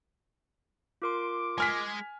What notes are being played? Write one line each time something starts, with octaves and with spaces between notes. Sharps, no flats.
F4 A#4 C6 D6
G#3 G#4 G#5 F6 B6